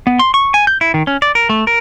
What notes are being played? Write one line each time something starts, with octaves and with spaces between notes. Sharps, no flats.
B3
C6
C#6
G#5
G6
E4
D#3
C#4
D5
A#4
A3
A#4